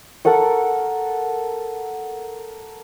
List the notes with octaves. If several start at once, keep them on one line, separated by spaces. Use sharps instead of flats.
A4 A#4 F#5 C#6